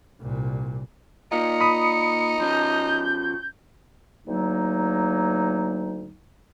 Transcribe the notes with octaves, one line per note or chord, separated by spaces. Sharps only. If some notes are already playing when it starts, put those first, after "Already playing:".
C2 A#2
A#3 D#4 F4 C#7
B5 D#6
F3 C#4 G6
D2 F#3 A#3 D#4